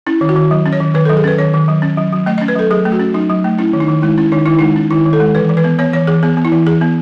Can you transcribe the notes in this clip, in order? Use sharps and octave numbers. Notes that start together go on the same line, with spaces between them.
C#4 E4
D#3
F#4
D#3
F#3
C#4
C#5
D#3
D#3 B4
F#3 A4
G#4
C#4 B4
D#3 C#5
D#3
F#3
C#4
F#3
F#3
A3 D#5
C#4 D#5
B4
F#3 A4
F#3 G#4
A3
F#4
C#4
F#3 D#4
F#3
A3
C#4 E4
D#3
D#4
D#3
G#3 E4
C#4 E4
D#3 D#4
D#3 E4
G#3 D#4
C#4
D#3 E4
D#3
A4
G#3
E3 B4
E3
B4
B3
B3 C#5
E3 C#5
E3 G#4
B3 G#4
B3
E4
E3
E3 G#4
B3